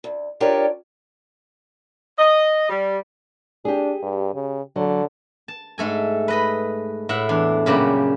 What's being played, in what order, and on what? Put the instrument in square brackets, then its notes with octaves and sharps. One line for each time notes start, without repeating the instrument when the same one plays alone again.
[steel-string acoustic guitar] D2
D4 F4 G4 A#4 C#5 D5
[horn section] D#5
G3
[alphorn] D4 [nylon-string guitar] G4 G#4
[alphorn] G2
C#3
[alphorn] D3 [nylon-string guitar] F#3
[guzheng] A5
G#2 A3 A4 G#5
B4 D#5 B5
A2 E5 F#5
E2 D4
F#2 A#2 C#3 G3 G4 F#5